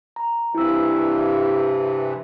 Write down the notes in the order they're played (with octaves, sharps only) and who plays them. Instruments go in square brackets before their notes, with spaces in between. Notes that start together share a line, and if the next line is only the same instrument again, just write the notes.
[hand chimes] A#5
[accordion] G2 C3 E3 [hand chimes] E4 E6